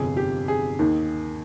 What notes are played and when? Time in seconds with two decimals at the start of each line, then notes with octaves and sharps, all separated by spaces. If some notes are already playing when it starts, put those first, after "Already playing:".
Already playing: G1 F2 C3 G#4
0.17 G4
0.48 G#4
0.79 D#2 D#3